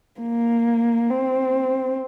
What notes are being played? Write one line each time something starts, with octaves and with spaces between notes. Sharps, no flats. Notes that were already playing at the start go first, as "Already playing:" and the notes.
A#3
C4